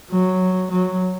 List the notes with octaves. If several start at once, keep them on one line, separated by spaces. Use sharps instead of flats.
F#3
F#3